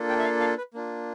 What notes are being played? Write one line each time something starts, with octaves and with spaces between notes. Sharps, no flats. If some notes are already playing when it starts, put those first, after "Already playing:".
Already playing: A#3 D4 F4 A4
G5
E5
F5
F5
B4
A#3 D4 F4